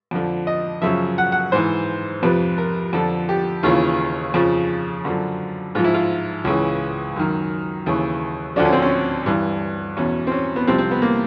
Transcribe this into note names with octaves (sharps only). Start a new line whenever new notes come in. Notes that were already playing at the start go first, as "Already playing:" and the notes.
F2 D3 F3
D#5
F#2 C#3 F3 E5
F#5
F#5
G#2 E3 C5
F2 C3 F3 B4
A#4
F2 D3 F3 A4
G4
D#2 C#3 E3 F4
F2 C#3 F3
F#2 D3 F3
G#2 F3 F4
E4
F4
C#2 C#3 E3
F#2 D#3
D#2 C#3 E3
D2 D3 F3 D4
C#4
C4
C#4
G2 E3
E2 B2 C#4
C4
C#4
B3
C2 C3 F3 C4
C4
B3
A#3